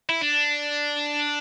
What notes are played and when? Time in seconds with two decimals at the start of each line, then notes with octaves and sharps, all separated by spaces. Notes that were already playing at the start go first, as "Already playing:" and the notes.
0.09 E4
0.22 D4